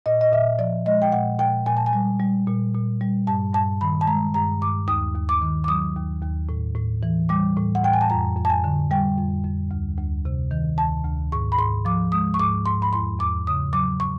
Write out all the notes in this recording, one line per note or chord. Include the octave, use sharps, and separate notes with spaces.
A#2 D#5
D#5
A#2 E5
F3 D5
G#3 D#5
G5
A#2 F#5
A#2 G5
A#2 G#5
A5
G#5
G3
G3
A#2
A#2
G3
G2 A5
G2 A5
D#3 B5
A5
G#3 A#5
G2 A#5
G2 D6
D#2 D#6
D#2
D6
D#3
D6
F#3 D#6
D#2
D#2
A2
A2
E3
G3 D6
A2
F#5
A2 G5
G#5
A5
F2 A#5
F2
A5
G#5
D3
G3 G5
F2
F2
D2
D2
C3
D#3
D2 A5
D2
G#2 C#6
B5
G#2 C6
F3 D6
G#3 D#6
C#6
G#2 D6
G#2 C6
B5
E2 C6
E2 D6
C#3 D#6
F#3 D6
C#6